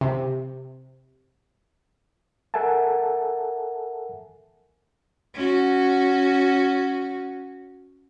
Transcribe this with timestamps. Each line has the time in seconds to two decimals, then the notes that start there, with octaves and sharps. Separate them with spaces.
0.01 C3
2.54 A4 A#4 E5 F#5 G#5 A5
5.34 C#4 F#4